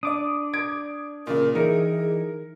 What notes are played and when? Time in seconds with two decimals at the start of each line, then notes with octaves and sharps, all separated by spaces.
0.03 D4 D5 D6 D#6
0.54 G#6 D7
1.27 A#2 C#3 A#4
1.55 E3 D#4 E4 G#4 A#4